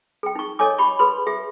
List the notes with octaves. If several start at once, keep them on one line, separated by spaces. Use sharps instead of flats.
G#4 G5
D#4 C#6
A4 C#5 D#5 G#5 D6
G4 B5 C#6
G#4 B4 B5 C6
G4 G#4 E5